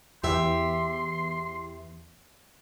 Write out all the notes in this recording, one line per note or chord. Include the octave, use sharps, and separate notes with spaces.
E2 E3 G4 E5 C6